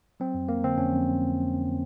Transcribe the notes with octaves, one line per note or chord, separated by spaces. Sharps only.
F#3 C4
F2
A#3
D3 C4
F2 C#4
F2